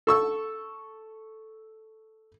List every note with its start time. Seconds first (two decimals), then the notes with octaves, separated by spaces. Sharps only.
0.07 A4 C#6 E6